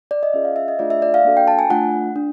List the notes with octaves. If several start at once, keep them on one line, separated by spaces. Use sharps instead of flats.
D5
D#5
C#4 F4 G#4 E5
F5
E5
D#5
A3 D4 F4 G#4 D5
E5
D5
F5
A#3 D4 F#4 A4
G5
A5
G#5
A3 D4 F4 F#5
D4